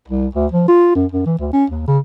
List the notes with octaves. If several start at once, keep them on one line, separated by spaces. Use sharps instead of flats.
C2
D2
F3
F4
F#2
F#2
E3
D2
C#4
D#2
C#3